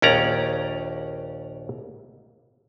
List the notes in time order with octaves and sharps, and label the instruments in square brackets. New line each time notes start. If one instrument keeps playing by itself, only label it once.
[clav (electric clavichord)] A#1 D#2 C#4 D5 A#5